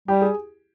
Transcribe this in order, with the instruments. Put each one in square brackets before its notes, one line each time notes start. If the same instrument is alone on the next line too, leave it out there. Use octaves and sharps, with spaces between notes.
[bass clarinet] G3 [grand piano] G4
[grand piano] G#4